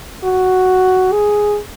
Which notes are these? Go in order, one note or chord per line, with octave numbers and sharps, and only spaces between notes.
F#4
G#4